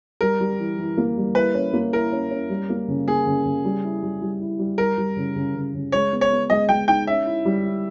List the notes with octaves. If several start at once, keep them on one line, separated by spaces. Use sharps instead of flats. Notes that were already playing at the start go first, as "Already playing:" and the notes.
G3 A#4
G3
E3
E3
A#3
G3
E4 B4
C#4
A#3
E4 A#4
C#4
C#4
G3
A#3
C#3
A#3 G#4
C#3
C#3
G3
E4
G3
G3
E4
G3
G3 A#4
G3
C#3
C#3
C#3
C#3
G#3 C#5
B3
C#5
B3
G#3 D#5
G#3 G5
D#4 G5
C#4 E5
E4
G3
E4